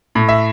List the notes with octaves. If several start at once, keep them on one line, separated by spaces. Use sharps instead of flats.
A2
E5